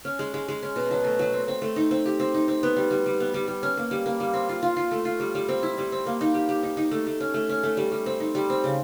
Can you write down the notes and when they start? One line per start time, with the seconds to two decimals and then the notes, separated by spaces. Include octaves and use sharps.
0.05 C#4
0.19 G#3
0.34 G#3
0.48 G#3
0.63 C#4
0.76 B2
0.91 F#3
1.04 A3
1.19 F#3
1.33 C4
1.48 C4
1.62 A3
1.76 D#4
1.91 C4
2.06 G4
2.20 C4
2.34 D#4
2.48 C4
2.63 B3
2.76 G3
2.91 G3
3.06 G3
3.20 B3
3.34 G3
3.48 G3
3.63 C#4
3.77 A#3
3.91 G3
4.06 A#3
4.20 G3
4.34 C4
4.49 F4
4.63 F4
4.77 F4
4.91 A3
5.05 F4
5.20 G3
5.35 G3
5.49 C4
5.63 E4
5.78 G3
5.92 C4
6.06 A#3
6.21 D#4
6.34 G4
6.49 G4
6.63 D#4
6.77 D#4
6.91 A3
7.07 A3
7.20 C#4
7.34 A3
7.49 C#4
7.63 A3
7.77 G3
7.92 G3
8.06 C4
8.20 D#4
8.35 G3
8.50 C4
8.64 C#3